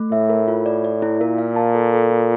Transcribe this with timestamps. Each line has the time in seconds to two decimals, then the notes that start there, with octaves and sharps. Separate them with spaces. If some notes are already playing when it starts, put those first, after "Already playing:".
Already playing: A3
0.11 A2 E5
0.30 A#4
0.48 F4
0.66 D5
0.85 D5
1.02 E4
1.20 A#2 A#4
1.38 F5
1.56 A5
1.75 A4
1.93 A4
2.11 F4